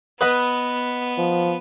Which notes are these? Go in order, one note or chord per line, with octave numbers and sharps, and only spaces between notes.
B3 B4 D#5 F#5
F3